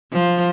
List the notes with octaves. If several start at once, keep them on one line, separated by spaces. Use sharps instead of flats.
F3